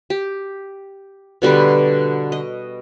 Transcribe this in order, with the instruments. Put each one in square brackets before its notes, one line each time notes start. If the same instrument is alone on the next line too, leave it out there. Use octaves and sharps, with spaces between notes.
[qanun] G4
B2 D3 G3 B4
D#5